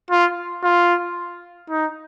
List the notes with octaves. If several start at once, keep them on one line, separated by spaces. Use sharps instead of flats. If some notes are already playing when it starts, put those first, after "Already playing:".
F4
F4
D#4